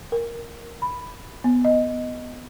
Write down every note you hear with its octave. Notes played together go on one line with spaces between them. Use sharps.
A#4
B5
B3
D#5